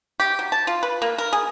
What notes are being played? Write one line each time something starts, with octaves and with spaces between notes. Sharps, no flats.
G4
F#3
A5
F4
B4
A#3
A#4
G#4